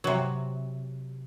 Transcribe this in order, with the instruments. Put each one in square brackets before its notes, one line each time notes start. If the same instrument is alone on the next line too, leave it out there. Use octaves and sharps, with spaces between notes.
[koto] C3 F#3